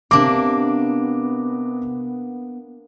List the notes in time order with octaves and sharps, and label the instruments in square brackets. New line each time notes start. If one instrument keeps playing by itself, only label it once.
[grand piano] C3 D6 [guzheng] A#3 D4 [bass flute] B3